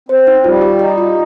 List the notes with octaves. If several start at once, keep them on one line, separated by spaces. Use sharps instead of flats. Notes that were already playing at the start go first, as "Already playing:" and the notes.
C4 C5
D#4
G3 F4
G4
D#4 G4
F4